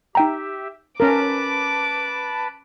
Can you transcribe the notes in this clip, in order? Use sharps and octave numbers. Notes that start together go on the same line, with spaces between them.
D#4 G4 E5 G5 A#5
C#4 A#4 B4 A5 B5 D6